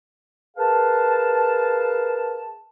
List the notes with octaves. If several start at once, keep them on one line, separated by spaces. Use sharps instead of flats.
G#4 A#4 B4 F5 A5